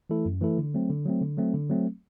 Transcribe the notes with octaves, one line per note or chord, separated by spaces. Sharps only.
E3 A3 E4 A4
F#2
E3 A3 E4 A4
D3
F#3 A3 C4
D3
F#3 A3 C4
D3
F#3 A3 C4
D3
F#3 A3 C4